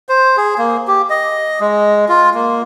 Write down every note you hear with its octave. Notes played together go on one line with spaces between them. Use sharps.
C5
G#4
A#3
G4
D#5
G#3
F4
A#3